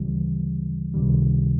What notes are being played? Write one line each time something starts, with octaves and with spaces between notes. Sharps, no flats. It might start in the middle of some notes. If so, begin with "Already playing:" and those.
Already playing: D2 C#3 E3 G3
C#2 C3 D#3 G3